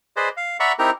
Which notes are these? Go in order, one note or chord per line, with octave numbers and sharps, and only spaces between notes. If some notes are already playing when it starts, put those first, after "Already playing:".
G#4 B4 C5 D5 D#5
F5
D5 E5 F#5 A#5 B5 C#6
C4 D#4 E4 G4 A#4 A#5